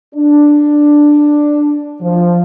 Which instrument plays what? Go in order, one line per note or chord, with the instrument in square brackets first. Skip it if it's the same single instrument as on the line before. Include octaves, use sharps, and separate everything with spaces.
[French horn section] D4
F3